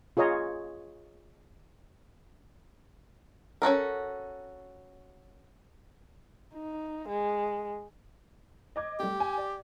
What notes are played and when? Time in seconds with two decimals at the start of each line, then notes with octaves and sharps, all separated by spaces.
0.17 F4 G#4 C#5 D#5 A#5
3.62 C#4 F#4 A4 A#4
6.54 D#4
7.08 G#3
8.76 D#5 D6 G#6
9.00 G3 A3 G4
9.20 G#5
9.38 D5